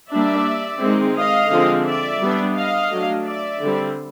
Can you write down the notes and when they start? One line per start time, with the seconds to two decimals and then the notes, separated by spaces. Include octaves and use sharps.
0.11 G3 A#3 D4 D5 E5
0.82 D#3 G#3 C4
1.16 D#5 F5
1.51 D3 F3 G#3 C4
1.86 D5 E5
2.21 G3 B3 D4
2.55 D#5 F5
2.90 F#3 A3 D4
3.25 D5 E5
3.61 D3 G3 C4